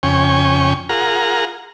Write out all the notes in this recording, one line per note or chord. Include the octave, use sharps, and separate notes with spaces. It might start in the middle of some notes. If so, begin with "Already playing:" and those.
F2 C#3 C#4 G5 G#5 C#6
F4 G#4 A#4 F#5 A#5